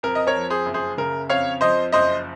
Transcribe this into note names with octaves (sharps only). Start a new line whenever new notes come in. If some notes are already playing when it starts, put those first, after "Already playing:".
F2 A#4
D#5
A#4 C#5
F3
G#4 C5
F#1
G#4 C5
C#3 A#4
F2 C#5 F5
F3 C5 D#5
F#1 C5 D#5